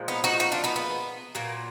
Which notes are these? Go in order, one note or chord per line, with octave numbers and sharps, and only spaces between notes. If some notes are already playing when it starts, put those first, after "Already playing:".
Already playing: A#2 F3 G#3
B3 D#4
D#4 F#4
D#4 F#4
D4 F4
B3 D#4
B3
A#2 F#3 A#3